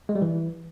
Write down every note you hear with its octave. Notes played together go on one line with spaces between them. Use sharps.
G#3
G3
E3